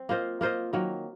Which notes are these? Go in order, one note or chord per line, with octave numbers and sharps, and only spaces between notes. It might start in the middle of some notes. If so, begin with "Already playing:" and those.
Already playing: C4
A#3 F4 C5 D#5
A#3 F4 C5 D#5
D#3 F#3 A#3